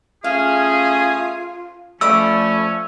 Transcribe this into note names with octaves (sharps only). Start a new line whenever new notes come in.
A3 C#4 F4 G#4 F5
F3 A3 C#4 A4 D5 B5 E6